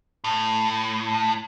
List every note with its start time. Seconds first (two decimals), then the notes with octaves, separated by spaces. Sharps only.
0.24 A2